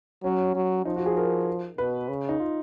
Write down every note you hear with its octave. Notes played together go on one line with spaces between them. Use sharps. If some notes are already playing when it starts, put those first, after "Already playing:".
F#3 C#4
F#3
F3 D#4
F#4
G#4
A#4
B2 B4
C#3
D#4
F4